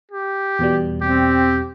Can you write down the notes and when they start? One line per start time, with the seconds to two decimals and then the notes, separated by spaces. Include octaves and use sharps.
0.11 G4
0.59 E2 B2 G3
1.02 C4 G4